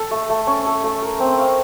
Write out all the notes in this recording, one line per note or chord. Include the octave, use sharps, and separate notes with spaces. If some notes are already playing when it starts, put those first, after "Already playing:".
Already playing: A4
A3
A3
C#4
A4
A3
A#4
C4
F5